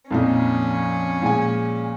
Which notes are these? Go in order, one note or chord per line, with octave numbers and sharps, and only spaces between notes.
F2 A#2 F3 C#4 D#4
A#2 G#3 G#5